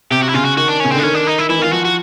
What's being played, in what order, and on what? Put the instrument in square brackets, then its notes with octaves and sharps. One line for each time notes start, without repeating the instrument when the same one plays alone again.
[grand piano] C3 [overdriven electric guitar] G4
[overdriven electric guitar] F#4
E4
[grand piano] C#3 [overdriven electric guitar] F4
[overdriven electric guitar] F#4
[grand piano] D#3 [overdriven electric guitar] F#4
[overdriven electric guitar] D4
[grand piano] C#3 [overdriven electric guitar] C#4
[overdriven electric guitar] C4
[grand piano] D3
[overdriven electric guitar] D4
[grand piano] D#3 [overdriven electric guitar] C#4
[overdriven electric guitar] D4
D#4
E4
[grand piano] E3 [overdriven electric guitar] E4
[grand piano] D#3
[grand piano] E3 [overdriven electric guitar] F4
[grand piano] F3 [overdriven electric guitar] F#4
[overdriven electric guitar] F#4